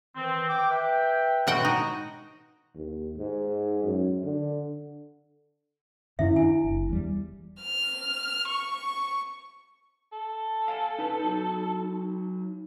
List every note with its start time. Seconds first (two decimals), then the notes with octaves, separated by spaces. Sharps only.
0.16 D#3 E3 C4
0.48 G5 D6
0.70 B4 E5 G5
1.47 B2 G#3 F#4 F#5 G5
1.65 D#4
2.76 D#2
3.18 G#2
3.84 F#2
4.24 D3
6.19 F#2 D#3 C#4 E4 E5
6.36 D4 E4 G#5
6.64 F#1
6.89 E2 G3
7.62 F6
8.48 C#6
10.12 A4
10.68 F5 G#5 A5
10.99 D#4 B4
11.19 F#3 D#4